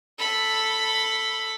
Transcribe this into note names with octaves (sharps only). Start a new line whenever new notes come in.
A4 B5